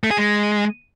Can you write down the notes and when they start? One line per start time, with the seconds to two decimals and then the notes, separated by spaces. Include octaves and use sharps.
0.04 A3
0.11 G#4
0.18 G#3